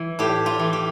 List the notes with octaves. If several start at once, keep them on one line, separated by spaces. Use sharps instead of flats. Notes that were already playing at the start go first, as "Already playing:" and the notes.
Already playing: E3
A2 G4
F4
E3
G4